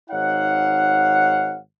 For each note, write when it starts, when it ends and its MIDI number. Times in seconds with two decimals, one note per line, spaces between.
0.10 1.59 32
0.10 1.59 63
0.10 1.59 73
0.10 1.59 77
0.10 1.59 78